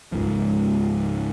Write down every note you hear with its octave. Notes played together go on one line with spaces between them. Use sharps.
C#2 G#2 F3